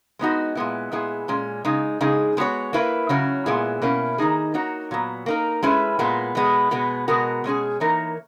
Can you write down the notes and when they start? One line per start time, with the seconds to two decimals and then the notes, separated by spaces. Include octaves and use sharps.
0.19 G#3 B3 D#4 F#4
0.55 A#2 G#3 B3 E4
0.92 A#2 G#3 B3 E4 G#4
1.28 A#2 G#3 C#4
1.65 C#3 G#3 D#4
2.01 C#3 G#3 D#4 G#4
2.37 G#3 B3 F#4 C#5
2.73 A#3 E4 B4
3.09 C#3 F#3 C#4
3.46 A#2 G#3 B3 E4 G#4
3.82 B2 A#3 C#4 E4
4.18 D#3 A#3 D#4 G#4
4.54 A#3 D#4 F#4 C#5
4.91 A#2 F#3 B3
5.26 A#3 D#4 A#4
5.63 G#3 C#4 E4 B4
5.99 A#2 G#3 B3
6.35 B2 G#3 B3
6.71 B2 G#3 B3
7.08 B2 G#3 B3 F#4 A#4
7.44 B2 G#3 C#4 G#4
7.80 E3 A#3 D#4 A#4 C#5